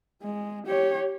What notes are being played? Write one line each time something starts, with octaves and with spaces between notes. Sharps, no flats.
G#3
G4 C#5